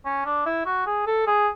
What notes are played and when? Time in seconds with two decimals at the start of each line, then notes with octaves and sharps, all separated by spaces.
0.05 C#4
0.25 D4
0.46 E4
0.66 F#4
0.86 G#4
1.07 A4
1.27 G#4